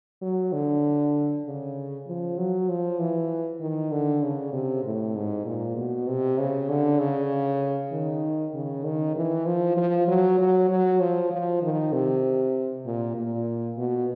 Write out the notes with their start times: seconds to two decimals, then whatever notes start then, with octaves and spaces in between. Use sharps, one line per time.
0.22 F#3
0.53 D3
1.45 C#3
2.07 F3
2.38 F#3
2.69 F3
2.99 E3
3.61 D#3
3.92 D3
4.23 C#3
4.53 C3
4.84 A2
5.16 G#2
5.46 A#2
5.77 B2
6.08 C3
6.39 C#3
6.69 D3
7.00 C#3
7.92 D#3
8.54 C#3
8.85 D#3
9.16 E3
9.46 F3
9.77 F3
10.08 F#3
10.39 F#3
10.70 F#3
11.01 F3
11.32 F3
11.62 D#3
11.93 C3
12.86 A#2
13.16 A#2
13.78 B2